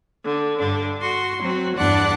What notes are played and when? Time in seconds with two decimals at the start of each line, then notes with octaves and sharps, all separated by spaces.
0.24 D3
0.58 G2 D3 D4
1.00 F#4 C6
1.41 F#3 C4 F#4
1.75 E2 G2 D4 D5 F#5 F#6